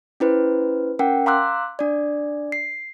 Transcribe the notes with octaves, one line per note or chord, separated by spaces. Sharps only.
C#4 E4 B4 C5
C#4 A#4 F#5 G5
F5 A#5 C6 D6 E6 F#6
D4 D5
C7